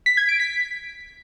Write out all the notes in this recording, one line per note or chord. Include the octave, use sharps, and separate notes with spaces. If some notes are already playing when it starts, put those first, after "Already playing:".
B6
G#6
D7
B6